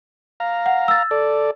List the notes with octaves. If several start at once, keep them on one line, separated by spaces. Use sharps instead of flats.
F5 A#5
F#5
E6 A6
A4 D5